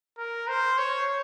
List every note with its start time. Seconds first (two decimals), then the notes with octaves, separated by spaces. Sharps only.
0.18 A#4
0.48 C5
0.78 C#5